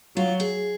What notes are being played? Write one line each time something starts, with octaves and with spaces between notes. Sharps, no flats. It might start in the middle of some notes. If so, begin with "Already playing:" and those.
F#3 F4
G#4